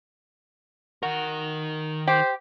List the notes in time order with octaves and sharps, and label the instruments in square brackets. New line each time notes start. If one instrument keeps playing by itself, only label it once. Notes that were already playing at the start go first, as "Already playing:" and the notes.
[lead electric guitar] D#3 A#4 [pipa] F#4
[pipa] G4 [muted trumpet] C5